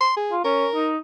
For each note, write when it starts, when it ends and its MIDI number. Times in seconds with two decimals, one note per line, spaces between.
0.01 0.14 84
0.17 0.34 68
0.32 0.44 65
0.45 0.66 61
0.45 0.90 70
0.74 0.97 63